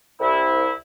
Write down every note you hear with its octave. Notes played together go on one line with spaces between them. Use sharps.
C2 E4